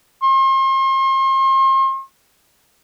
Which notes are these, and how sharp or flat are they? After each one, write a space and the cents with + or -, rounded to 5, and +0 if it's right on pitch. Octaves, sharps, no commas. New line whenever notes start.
C6 +40